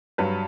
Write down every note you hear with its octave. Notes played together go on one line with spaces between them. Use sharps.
G2 F#3 B4